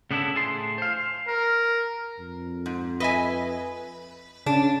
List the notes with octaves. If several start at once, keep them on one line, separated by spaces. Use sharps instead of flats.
C#3 B3 D4 E4 A4
A2 G#4 A5 C6
C5 F5
A#4
F2
G#2
B4 D#5 E5 G#5
C#3 C#4 D4